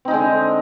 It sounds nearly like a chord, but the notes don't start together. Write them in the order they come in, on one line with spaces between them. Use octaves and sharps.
C4 D#4 G#3 D3